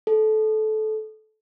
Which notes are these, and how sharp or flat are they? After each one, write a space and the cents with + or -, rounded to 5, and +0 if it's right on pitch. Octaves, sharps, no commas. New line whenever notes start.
A4 -20